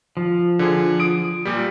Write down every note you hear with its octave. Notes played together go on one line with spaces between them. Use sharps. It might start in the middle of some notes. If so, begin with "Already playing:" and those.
F3
D3 G#4
D#6 D7
A#2 G3